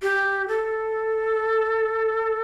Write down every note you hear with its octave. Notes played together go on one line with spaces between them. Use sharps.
G4
A4